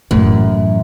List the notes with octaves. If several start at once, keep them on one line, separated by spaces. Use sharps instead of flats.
F#2 A2 E3